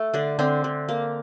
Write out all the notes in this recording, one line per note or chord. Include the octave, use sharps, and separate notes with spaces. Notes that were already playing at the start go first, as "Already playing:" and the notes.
Already playing: A3
D3 D4
D3 C4
D3
A#3